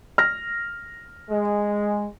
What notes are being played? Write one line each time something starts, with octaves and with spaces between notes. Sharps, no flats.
F6 A#6
G#3